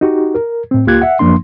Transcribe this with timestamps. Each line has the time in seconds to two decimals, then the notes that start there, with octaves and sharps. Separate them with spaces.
0.01 D#4 F#4 G4
0.35 A#4
0.71 A2 C4
0.87 C#2 A#3 F4 G4 F#6 G#6
1.02 E5 F#5
1.19 F#2 F3 A#3 D4 C6